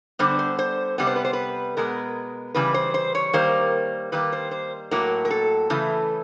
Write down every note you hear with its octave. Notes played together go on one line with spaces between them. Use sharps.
D3 G3 B3 C5
C5
C5
C3 D#3 G3 B3 B4
C5
B4
C5
B4
B2 G#3 B3 A#4
C#3 E3 G3 B4
C5
C5
C#5
D#3 G3 A#3 C5
D#3 G3 A#3 B4
C5
C5
A2 F#3 A#3 A#4
A#4
A4
C#3 E3 A3